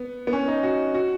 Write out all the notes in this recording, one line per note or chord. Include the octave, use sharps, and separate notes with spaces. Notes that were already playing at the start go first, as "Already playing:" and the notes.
Already playing: B3
B3
C#4
D#4
F#4
F#4